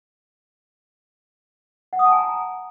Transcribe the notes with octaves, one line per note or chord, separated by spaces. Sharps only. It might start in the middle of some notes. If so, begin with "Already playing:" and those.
F#5
D#6
A5
G#5
A#5